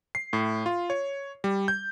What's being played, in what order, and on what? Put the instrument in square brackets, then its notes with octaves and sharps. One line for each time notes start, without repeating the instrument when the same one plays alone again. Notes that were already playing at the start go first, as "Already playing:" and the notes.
[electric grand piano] C7
A2
F4
C#5
G3
G6